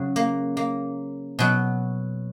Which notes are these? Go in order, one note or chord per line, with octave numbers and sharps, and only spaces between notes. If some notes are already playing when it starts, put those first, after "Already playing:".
Already playing: C#3 F#3
A#3
A#3
B2 F#3